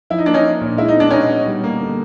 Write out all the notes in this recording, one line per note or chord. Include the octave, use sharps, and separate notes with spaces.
F3 E4
D#4
A#3 D4
C#4 D#4
D4
A#2
G#3 E4
D#4
B3 D4
B2 C#4 D#4
B2
G3
A#3
D3